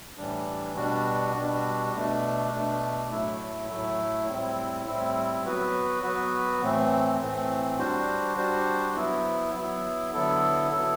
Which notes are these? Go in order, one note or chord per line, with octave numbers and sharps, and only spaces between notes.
A2 E3 G3 D4
B2 G3 D4 F#4
B2 G3 D4 F#4
B2 A3 D4
B2 A3 D4
A2 F#3 A3 E4
A2 F#3 A3 E4
A2 G3 C4 E4
A2 G3 C4 E4
F#3 B3 F#4 B4
F#3 B3 F#4 B4
A2 E3 A3 C4
A2 E3 A3 C4
G3 D4 F#4 C5
G3 D4 F#4 C5
F#3 B3 E4
F#3 B3 E4
D3 F#3 B3 E4 A4
D3 F#3 B3 E4 A4